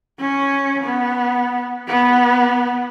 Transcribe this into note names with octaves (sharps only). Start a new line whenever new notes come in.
C#4
B3
B3